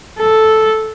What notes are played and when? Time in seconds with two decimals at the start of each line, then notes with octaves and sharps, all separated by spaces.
0.18 A4